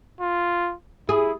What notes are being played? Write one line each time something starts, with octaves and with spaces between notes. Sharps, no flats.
F4
E4 G#4